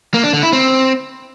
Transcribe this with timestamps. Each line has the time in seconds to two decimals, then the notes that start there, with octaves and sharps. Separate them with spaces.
0.14 A#3
0.24 D4
0.33 D3
0.43 E4
0.53 C4